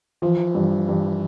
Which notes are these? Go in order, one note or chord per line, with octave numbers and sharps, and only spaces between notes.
E3 F3
G2
G2